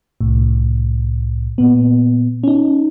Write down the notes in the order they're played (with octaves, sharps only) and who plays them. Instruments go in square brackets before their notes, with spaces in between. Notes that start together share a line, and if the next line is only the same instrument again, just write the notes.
[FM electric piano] C2 A2
A#2 B3
C#4 D#4